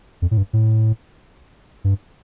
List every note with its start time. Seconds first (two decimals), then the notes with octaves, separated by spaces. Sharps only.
0.22 F2
0.31 A2
0.37 G2
0.53 A2
1.84 G2